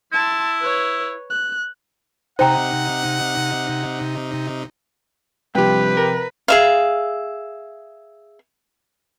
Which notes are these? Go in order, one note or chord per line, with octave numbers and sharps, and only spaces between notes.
E4 A5 C6
B4 C#5
F#6
C3 D#4 C5 F#5 G5 A#5
G2 C3 F3 F4 G4 B4 G5
A#4
G#4 E5 F5